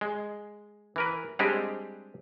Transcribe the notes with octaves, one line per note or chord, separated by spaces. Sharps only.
G#3
E3 A#4 B4
G3 G#3 C4 D4 G4 G#4